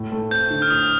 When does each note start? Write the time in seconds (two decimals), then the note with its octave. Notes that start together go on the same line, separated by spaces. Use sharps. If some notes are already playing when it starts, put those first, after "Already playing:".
Already playing: A2
0.12 A3
0.31 C4 G6
0.51 D3
0.62 F6
0.70 A2 D#6